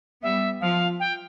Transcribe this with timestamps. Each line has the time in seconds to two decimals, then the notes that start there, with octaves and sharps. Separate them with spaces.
0.22 G3 B3 E5
0.61 F3 F5
1.00 G5